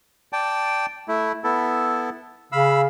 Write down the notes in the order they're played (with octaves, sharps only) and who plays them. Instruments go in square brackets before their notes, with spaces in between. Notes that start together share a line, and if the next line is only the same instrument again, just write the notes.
[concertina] D5 G5 A5
A3 E4
B3 E4 A4
[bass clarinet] C#3 [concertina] F5 B5 E6